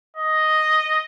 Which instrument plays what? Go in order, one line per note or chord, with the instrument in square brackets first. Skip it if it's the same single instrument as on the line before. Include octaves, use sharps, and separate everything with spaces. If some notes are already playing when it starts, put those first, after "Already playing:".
[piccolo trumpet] D#5